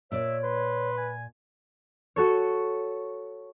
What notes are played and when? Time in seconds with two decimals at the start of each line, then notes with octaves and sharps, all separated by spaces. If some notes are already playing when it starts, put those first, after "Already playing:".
0.12 A#2 C#5 D5 E5
0.44 B4 C6
0.98 G#5
2.16 F#4 A4 C#5